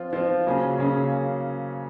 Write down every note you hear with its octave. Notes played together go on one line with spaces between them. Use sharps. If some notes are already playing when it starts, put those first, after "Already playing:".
Already playing: F3 C4 F4
F3 C4 F4
C#3 F#3 A#3 C#4 G#4
C#3 F#3 A#3 C#4 G#4